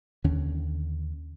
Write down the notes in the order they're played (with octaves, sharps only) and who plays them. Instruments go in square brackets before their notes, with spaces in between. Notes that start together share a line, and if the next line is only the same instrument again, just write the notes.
[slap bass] D#2 D3 C#4